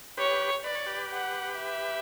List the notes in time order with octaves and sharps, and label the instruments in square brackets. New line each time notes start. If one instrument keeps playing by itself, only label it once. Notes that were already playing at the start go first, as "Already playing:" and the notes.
[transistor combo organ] G4 B4 [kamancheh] C#5
[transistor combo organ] B4 [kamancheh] D5
[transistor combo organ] C#5
G4 B4
[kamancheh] F#5
E5